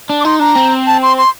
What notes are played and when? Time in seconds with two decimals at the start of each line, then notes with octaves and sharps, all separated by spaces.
0.10 D4
0.20 D6
0.25 D#4 C6
0.40 D4 A#5
0.56 C4
0.87 A5
1.02 C6
1.18 C6